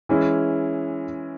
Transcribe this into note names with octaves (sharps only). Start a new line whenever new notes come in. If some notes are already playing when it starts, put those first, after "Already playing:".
E3 G#3 C#4 E4